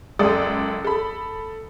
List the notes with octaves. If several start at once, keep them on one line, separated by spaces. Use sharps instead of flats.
C#2 F#2 G#3 A4 D5 D#6
A4 B5